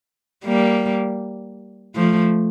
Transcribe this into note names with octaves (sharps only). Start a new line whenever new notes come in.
G3 A#3
F3 A3